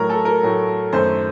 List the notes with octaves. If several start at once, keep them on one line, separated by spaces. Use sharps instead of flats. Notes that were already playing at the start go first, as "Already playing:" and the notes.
Already playing: A2 F#3 A3 A#4
A4
A#4
A2 F#3 A3
F#2 D#3 A3 C5